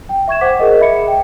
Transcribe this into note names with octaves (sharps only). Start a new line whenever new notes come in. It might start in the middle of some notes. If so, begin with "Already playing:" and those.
G5
E5 C#6 G#6 E7
C5 F#5 D6 B6
G#4 A#4 D#5
E5 B5 C#7
G5